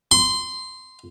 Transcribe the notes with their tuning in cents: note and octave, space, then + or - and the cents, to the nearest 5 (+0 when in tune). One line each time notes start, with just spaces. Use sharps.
C6 -20